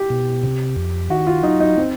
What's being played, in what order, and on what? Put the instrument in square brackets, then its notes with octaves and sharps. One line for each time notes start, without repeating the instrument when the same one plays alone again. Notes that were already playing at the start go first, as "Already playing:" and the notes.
Already playing: [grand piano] G4
[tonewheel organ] B2
C3
F2
[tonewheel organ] D#3 [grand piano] F#4
[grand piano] F4
[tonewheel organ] F#3 [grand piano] D#4
[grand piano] D#4
C4